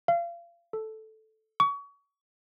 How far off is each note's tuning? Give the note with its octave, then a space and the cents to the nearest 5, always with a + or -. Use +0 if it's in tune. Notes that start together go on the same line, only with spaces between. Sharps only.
F5 -30
A4 -5
C#6 +30